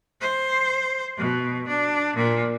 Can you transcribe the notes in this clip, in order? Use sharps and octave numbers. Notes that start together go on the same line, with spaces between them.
C5
B2
D4
A#2